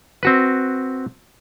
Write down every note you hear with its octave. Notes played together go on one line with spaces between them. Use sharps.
C4 F#4 B4